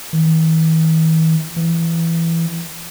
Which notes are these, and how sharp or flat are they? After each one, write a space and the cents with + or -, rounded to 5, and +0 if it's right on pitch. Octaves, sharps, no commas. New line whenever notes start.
E3 -45
E3 +10